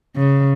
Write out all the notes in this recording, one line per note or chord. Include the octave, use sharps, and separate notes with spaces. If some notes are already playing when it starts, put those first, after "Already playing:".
C#3